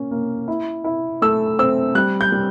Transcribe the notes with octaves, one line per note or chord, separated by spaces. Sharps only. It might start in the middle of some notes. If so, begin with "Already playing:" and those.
Already playing: A#3 C#4
A#3
E4
E4
A3 E6
C4 E6
G3 F#6
G6
G3